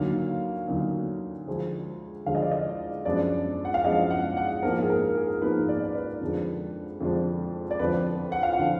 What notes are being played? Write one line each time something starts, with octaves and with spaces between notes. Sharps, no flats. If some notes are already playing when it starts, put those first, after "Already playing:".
Already playing: D2 D3 F#3 A#3 D#4 F5
D2 D3 F#3 A#3 D#4
D2 D3 F3 G#3
D2 D3 F3 G#3 F5
D#5
D5
D#5
F#2 F3 G#3 B3 D4 D5
F#5
F5
F#2 F3 G#3 B3 D4 D#5
F#5
F#5
G#2 F3 A#3 D#4 A#4
G#4
A#4
G#4
G#2 F3 A#3 D#4 B4
D5
D5
B4
F2 D3 F3 G#3 D4
F2 D3 F3 G#3 D4
D5
F2 D3 F3 B4
F#5
F5
F#5
D3 F3